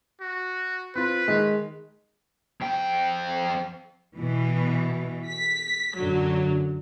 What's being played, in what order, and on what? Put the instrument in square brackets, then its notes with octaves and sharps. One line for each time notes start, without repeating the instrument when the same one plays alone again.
[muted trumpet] F#4
[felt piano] C4 F4 [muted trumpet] B4
[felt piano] D#3 G#3
[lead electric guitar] F2 G5
[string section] B2 E3
B6
F#2 D3 F#3